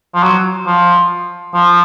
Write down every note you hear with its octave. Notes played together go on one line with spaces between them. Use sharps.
F3
F#3
F3
F3